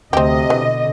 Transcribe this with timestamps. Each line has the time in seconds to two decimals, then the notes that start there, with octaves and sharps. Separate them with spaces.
0.13 D2 C3 C4 G4 D#5
0.50 B2 D3 E3